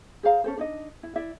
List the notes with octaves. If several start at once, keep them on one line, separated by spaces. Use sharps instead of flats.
G#4 C5 F5 A#5
C#4 A4 C5
D4 D#4 D#5
E4
E4 D5 E5